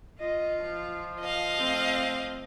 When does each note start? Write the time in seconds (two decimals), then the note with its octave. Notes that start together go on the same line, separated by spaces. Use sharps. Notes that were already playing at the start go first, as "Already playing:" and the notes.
0.20 F4 D#5
0.61 F3
1.20 D#5 F5
1.57 A3 C4